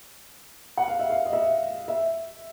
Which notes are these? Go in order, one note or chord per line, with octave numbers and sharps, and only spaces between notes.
F#5
F5
E5
F5
D#5
E5
E5